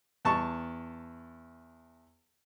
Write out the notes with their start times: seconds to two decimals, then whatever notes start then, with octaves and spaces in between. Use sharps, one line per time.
0.25 E2 A5 C#6